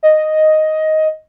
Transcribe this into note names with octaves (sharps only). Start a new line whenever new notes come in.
D#5